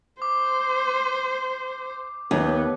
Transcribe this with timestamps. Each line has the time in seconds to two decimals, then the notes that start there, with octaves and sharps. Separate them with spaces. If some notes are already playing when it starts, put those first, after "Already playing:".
0.22 C5 D6
2.31 D#2 B3